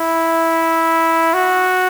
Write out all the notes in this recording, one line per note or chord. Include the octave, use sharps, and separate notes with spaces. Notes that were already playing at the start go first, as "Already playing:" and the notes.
Already playing: E4
F#4